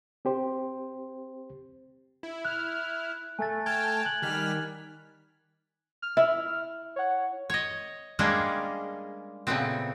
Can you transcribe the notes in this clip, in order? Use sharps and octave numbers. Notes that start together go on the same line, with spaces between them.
C4 G4 C5
E4
F6 F#6
A3 G#5 A6
G5 A5 F6 G#6
F#6 F#7
D#3 G3 F6 B6
F6
E4
C#5 F#5
C#5 D#5
G3 G#3 A#3 C#4 D4 G#4
A#2 C#3 A3 B3 C4